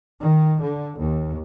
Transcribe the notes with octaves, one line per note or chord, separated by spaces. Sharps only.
D#3
D3
D#2